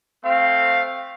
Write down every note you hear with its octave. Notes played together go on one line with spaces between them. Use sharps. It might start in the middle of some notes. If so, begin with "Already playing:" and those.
A3 C4 F5